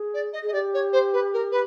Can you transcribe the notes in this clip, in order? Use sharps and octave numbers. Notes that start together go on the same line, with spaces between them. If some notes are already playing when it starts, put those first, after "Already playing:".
Already playing: G#4
D5
D#5
G#4
D#5
G4 D5
C#5
C5
B4
A#4
B4